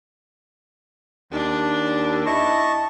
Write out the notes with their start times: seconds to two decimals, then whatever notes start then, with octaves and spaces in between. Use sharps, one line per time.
1.32 D#2 D4
2.26 E4 D#5 A5 C#6